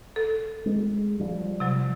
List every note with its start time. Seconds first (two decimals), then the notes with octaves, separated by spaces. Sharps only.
0.16 A4
0.66 G#3
1.20 F3 G3
1.60 C3 F#3